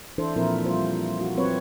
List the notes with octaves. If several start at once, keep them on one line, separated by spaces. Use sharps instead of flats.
E3 D4 E4 A4 C5
A#2 F3 C4 E4 A#4
G3 F4 C5
F4 F#4
F#3 C4 B4 C#5